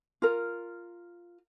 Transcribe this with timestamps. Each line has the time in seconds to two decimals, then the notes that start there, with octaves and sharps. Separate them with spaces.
0.22 F4 A#4